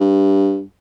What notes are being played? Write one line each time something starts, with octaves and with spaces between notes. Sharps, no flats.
G2